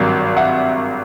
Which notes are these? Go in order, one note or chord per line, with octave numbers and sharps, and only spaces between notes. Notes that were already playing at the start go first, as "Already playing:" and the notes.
Already playing: G#1 G2 D#3 F#3
E5 F#5